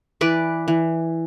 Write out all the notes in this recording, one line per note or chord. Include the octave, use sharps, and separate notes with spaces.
E3 B4 D5
E3